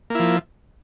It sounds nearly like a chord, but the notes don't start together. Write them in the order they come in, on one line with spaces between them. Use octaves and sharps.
A#3 E4 F3